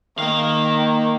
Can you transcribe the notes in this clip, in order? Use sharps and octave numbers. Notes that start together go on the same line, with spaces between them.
D#3 A#3 F5